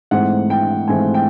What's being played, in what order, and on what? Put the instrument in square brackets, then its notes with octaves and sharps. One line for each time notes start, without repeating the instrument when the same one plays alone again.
[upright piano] G#2 E3 A3 C4 F#5
G5
G#2 E3 A3 C4 G#5
G5